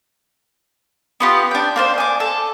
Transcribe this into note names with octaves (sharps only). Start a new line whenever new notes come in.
B3 F4 G4
D4 G5
A#3 D4 C5
G#5 D6
A4